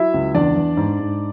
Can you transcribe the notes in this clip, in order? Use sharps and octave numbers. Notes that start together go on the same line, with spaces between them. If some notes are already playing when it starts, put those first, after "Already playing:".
Already playing: F#3 E4 E5
C#2
E2 D4 D5
E2
G#2
G#2